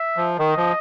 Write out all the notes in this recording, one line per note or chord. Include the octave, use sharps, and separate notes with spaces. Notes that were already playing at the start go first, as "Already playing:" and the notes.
Already playing: E5
F3
D#3 D#5
F3